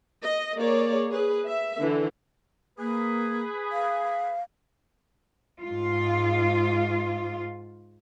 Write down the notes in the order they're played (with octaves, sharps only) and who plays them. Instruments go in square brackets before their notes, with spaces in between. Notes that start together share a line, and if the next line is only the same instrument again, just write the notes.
[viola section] D#5
A#3 G#4 C#5 D5
G#4 B4
E5
D3 E3
[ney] A#3 [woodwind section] G#4 B4
[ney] F5
[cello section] G#2 F4